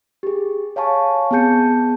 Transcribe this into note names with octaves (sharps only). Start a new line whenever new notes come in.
G4 G#4
C#5 F5 G#5 A5 C#6
B3 C4 G#4 A5 G6 C#7